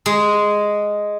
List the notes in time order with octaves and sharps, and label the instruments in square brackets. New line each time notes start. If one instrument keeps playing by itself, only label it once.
[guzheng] G#3